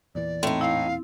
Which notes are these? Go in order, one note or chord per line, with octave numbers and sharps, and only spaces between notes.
E2 A#2 E3 D5
A2 C4 D#4
E4 F5